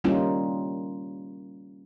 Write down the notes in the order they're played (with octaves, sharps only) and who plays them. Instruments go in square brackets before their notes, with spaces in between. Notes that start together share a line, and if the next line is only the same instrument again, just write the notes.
[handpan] G3 A#3 C#4 D#4 F4